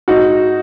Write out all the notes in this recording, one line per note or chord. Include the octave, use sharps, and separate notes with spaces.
G#2 D#4 F#4